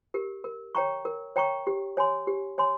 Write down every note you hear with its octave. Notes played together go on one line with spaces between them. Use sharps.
G4 A#4
A#4
C#5 G5 A#5 C#6
A#4
C#5 G5 A#5 C#6
G4
C#5 G#5 C6
G4
C#5 G#5 C6